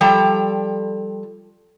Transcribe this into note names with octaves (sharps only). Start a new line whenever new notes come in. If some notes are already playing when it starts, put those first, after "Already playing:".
F3 G3 A4 G5 A#5